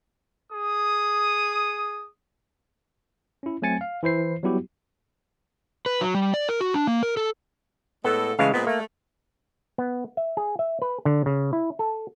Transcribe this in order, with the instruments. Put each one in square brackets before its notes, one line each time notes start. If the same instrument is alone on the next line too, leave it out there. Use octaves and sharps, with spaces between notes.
[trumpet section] G#4 D#6
[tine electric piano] C#4 E4
F#3 A3 C4 G#5 A6 C#7
F5
E3 E4 C5 C7
F#3 G3 B3 E4 F#4 G4
[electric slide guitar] B4
F#3
G3
D5
A#4
F#4
D4
A#3
A#4
A4
[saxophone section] A2 G#3 A4 [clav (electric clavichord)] B3
[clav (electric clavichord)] C#3 E3 G#3 [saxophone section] A3 F5
[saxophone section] A#2 G#3 C4 [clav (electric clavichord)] B3
[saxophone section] A3 [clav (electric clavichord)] A#3
[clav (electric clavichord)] B3
E5
G#4
E5
B4
D3
C#3
E4
A4